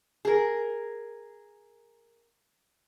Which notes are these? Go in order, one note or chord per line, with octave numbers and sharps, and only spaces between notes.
G#4 A#4